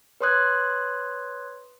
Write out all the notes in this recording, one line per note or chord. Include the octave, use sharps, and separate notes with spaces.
B4 C#5 C6 D#6 F#6 G#6